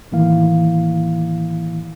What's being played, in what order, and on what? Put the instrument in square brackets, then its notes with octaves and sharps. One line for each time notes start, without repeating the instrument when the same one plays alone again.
[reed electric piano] A2 D#3 E3 A#3 E4 F5